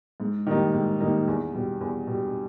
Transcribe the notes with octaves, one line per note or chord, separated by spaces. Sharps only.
G#2
D#3 G3 A#3 D#4
G#2
D#3 G3 A#3 D#4
E2
B2 G3
E2
B2 G3